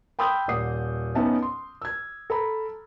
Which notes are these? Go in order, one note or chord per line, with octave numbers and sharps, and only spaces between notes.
G5 B5 C6 D#6 E6 G6
D#1 D5 F#5 D#6 C7
B3 C#4 D#4 E5 A5
C6
E6 G#6
A4 A#5 B5